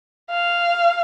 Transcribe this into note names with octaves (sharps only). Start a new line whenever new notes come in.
F5